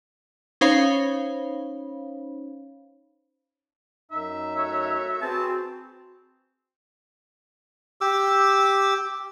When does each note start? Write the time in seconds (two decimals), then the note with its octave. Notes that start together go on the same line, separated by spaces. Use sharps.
0.61 C#4 D#4 C5 C#5 F5 B5
4.11 F#2 D#4 E5
4.57 A3 F#4 C#5
5.22 C4 F#4 G#4 B4 A5
8.01 G4 D6 E6